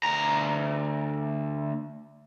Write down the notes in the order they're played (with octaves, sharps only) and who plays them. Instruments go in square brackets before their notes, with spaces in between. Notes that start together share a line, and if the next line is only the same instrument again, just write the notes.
[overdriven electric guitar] D2 A#5